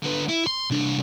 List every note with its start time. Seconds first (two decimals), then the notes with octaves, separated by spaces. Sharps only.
0.03 D3 B4
0.29 E4
0.47 C6
0.70 C2 D4